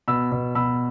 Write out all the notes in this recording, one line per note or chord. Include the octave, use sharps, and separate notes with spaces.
B2 B5 E6
B2
B2 B5 E6